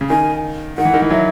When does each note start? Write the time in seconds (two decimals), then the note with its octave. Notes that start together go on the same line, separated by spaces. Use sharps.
0.01 C#3
0.10 D#3 G#5
0.78 D#3 F#5
0.85 E3
0.94 D#3
1.02 E3
1.10 F#3 E5